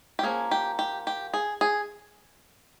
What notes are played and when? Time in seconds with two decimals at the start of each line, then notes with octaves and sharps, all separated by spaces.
0.19 G4
0.23 F3 A#3 C#4 G#4
0.51 G4
0.79 G4
1.07 G4
1.34 G#4
1.61 G#4